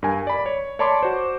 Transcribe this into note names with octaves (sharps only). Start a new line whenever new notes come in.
G2 A#4 G#5
D5 B5
C#5
C#5 D5 A5 B5 C6 D6
F#4 C5